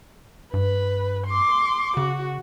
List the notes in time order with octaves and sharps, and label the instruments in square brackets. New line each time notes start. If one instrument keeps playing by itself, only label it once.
[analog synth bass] G2 [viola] B4
[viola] C6 D6
[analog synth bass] C#3 [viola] F#4